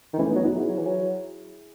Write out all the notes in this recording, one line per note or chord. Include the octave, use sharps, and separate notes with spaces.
D#3
E3 A3 C#4
F#3 B3 D#4
D#4 F#4
F#3
E4 G#4
F#3
E3
F#3